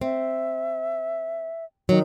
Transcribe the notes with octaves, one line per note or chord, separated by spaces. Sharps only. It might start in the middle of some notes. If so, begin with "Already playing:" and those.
C4 E5
D#3 F#3